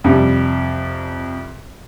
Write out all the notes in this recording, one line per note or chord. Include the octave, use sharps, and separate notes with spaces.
F2 C3 G3